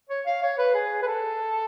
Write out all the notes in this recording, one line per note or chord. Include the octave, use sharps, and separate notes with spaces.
C#5
F5
C#5
B4
G#4
B4
A4